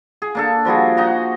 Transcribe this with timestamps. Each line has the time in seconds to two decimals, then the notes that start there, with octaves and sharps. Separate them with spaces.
0.22 G#4
0.35 A#3 D4 A4
0.65 F3 G3 F#4 G#4
0.97 D#4 F#4 A#5